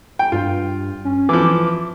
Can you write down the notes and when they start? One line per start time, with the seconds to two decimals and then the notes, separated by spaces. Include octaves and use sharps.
0.19 G5
0.32 G2 F4
1.05 C#4
1.29 E3 F3 D6